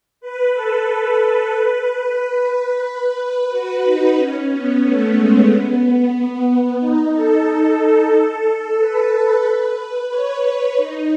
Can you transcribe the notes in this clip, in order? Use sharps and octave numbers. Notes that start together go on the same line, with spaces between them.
B4
A4
B4
F#4
D#4
C#4
B3
A3
G#3
B3
B3
D#4
A4
A4
B4
C#5
B4
D#4